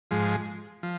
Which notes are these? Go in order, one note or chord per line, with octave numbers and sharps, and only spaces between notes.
G#2 F3 G#3
F3